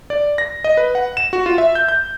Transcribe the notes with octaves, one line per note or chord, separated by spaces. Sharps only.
D5
A#6
D#5
B4
F#5
E7
F#4
F4
E5
G6
G6